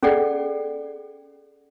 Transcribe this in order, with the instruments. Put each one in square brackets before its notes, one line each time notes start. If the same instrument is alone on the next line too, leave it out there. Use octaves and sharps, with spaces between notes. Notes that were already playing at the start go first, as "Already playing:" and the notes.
[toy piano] C#4 G#4 A4 D5 F#5 G5